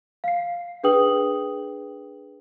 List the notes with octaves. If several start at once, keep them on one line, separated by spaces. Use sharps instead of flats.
F5 C7
D4 G#4 B4 G5 D#6 F#7